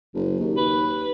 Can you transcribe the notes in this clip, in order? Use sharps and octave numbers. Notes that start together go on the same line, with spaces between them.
F#1
D#2
B4